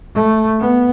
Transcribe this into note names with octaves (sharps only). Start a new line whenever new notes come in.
A3
B3